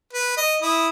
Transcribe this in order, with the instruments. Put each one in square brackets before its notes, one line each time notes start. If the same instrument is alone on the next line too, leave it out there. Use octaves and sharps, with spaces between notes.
[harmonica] B4
D#5
E4 D#6